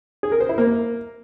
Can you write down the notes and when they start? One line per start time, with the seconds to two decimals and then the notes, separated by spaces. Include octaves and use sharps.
0.23 G#4
0.32 A#4
0.40 C5
0.49 E4
0.58 A#3